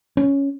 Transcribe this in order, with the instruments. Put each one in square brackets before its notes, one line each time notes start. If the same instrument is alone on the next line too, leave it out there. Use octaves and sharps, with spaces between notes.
[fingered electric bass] C#4